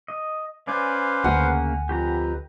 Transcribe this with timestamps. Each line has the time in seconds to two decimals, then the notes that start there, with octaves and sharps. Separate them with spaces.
0.08 D#5
0.67 C#4 B4 C5 D5 F5 G#5
1.24 D2 C#3 A#3 A#4 F#5 G#5
1.89 F2 G4 B4 A#5